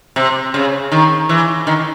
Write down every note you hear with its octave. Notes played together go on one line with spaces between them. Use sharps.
C3
C#3
D#3
E3
D#3